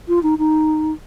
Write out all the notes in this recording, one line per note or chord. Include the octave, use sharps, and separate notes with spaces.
F4
D#4
D#4